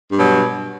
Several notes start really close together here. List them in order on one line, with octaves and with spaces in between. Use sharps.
G2 B2 F#3